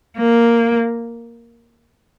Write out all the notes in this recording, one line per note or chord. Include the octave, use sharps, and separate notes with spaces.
A#3